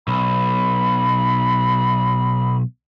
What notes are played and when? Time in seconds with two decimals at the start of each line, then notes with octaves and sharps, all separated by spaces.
0.08 B1 B5